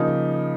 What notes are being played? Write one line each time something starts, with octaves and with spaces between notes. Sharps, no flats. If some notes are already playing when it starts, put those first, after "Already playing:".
Already playing: C#3 F3 A#3 D#4